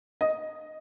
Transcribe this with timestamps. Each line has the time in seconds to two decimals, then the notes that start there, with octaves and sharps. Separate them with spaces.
0.21 D#5